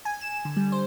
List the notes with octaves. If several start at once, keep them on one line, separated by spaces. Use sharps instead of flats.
G#5
E7
D3
G3
C5